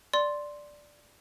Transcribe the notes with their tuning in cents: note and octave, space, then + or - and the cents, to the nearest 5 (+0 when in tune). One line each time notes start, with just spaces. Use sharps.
D5 +0 C6 +0